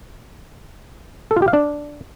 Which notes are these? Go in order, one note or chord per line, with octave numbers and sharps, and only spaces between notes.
A4
F4
G4
F5
D4